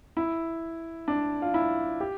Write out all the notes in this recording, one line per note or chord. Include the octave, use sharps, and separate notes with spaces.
E4
D4
F4
E4
G4